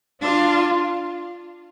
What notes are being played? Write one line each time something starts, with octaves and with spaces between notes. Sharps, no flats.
D4 F4